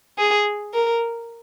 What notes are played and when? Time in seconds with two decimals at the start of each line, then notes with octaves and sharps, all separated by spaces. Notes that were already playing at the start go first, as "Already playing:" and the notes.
0.18 G#4
0.74 A#4